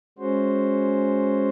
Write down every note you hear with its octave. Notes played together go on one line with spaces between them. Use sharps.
G#3 C#4 F#4 C5